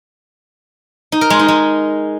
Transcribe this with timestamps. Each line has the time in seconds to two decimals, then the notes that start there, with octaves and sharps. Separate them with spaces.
1.12 D#4
1.21 A#4
1.30 G#3
1.39 D#4
1.48 G#3